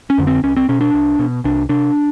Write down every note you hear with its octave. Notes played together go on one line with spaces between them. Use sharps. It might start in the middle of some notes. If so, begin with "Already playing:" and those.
C#4
F2 D3
C4
C2 C#4
C4
B2 C#4
D4
C2
B2
C2 D4
C3 D4